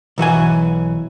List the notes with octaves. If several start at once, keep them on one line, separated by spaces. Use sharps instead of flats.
B1 E3 F#4 G#5